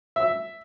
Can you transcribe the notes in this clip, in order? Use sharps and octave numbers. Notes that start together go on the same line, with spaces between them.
E5